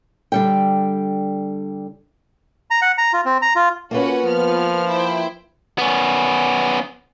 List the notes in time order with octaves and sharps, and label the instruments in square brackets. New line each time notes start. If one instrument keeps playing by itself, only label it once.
[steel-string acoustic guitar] D3 G3 G5
[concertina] A#5
F#5
A#5
F4
C4
A#5
F4
[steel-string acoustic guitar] A#3 F4 B4 [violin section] C#4 F#4 F#5
[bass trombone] F3 [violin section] B3 F6
[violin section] E4 C5 G5
[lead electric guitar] B3 C#4